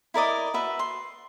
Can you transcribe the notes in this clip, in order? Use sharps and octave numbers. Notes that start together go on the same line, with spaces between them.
E4 A#4 D5 D#5
F#4 B4 E5
C6